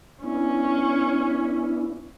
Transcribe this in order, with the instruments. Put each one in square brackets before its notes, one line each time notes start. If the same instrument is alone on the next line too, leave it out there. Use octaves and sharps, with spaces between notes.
[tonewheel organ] B3 D4 E4 [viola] C#4